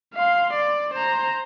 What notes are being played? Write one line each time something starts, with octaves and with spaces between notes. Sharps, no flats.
F5 C6
D5
C5 A#5